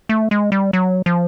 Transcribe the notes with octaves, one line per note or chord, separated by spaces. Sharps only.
A3
G#3
G3
F#3
F3